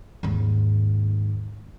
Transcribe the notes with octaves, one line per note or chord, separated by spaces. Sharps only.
D#2 G#2